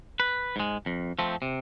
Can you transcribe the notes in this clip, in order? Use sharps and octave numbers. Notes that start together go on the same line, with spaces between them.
B4
G#2 G#3
F2
F3 A3 C4
C3